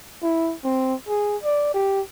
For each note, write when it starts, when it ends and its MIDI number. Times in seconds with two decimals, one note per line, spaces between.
0.23 0.55 64
0.64 0.94 60
1.08 1.37 68
1.43 1.70 74
1.74 2.01 67